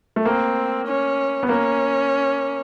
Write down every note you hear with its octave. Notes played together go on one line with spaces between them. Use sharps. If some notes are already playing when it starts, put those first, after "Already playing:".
A3
A#3 C4
C#4
B3
A#3 C#4